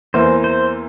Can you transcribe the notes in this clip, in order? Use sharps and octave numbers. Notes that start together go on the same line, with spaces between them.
E2 E3 A#3 C5
C5